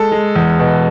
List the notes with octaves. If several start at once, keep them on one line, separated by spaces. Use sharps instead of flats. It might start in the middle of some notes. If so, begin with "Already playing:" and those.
Already playing: G#3 A4
G#3
E2
B2